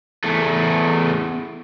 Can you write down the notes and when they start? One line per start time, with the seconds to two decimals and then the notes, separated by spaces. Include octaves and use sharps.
0.24 E2 A3